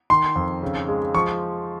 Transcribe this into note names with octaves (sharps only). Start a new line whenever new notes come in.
D#3 C6
F2
C#3
G#3
F3 C#6